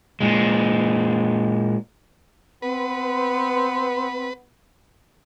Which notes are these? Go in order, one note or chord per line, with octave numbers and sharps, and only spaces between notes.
A#2 G#3
B3 C4 B4